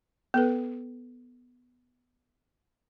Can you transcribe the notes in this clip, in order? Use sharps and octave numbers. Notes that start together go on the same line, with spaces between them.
B3 A4 B4